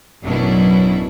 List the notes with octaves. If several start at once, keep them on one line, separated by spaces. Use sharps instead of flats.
A1 F#2 B2 F#3 D4 E4